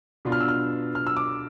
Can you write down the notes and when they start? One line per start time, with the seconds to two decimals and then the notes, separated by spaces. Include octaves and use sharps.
0.25 B2 B3 D4 F4
0.32 F6
0.40 E6
0.48 F6
0.95 F6
1.07 E6
1.17 D6